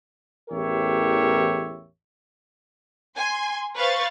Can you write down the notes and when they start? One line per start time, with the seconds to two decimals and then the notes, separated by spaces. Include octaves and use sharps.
0.50 A1 E2 G4 A#4 C#5 E5
3.17 G#5 C6
3.76 B4 C5 F5 C#6 A6